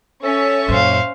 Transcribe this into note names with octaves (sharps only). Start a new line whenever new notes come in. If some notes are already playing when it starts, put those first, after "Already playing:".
C#4 A4 E5 C#6
F#2 A#2 C5 F5